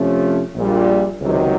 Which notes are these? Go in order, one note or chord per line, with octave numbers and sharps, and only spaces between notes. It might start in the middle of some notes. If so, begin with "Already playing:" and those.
Already playing: C3 F3 A3 C#4
A#1 A#2 G3
C#2 C3 D#3 F#3